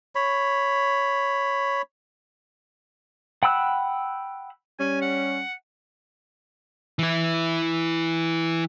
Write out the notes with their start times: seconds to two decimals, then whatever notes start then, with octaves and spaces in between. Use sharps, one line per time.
0.15 C#5 B5
3.43 F#5 G5 B5 E6 F#6
4.79 G3 C#4 G#5
5.01 F#5
6.99 E3 E4